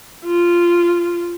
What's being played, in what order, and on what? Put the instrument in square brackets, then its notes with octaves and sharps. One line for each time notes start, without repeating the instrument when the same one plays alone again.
[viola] F4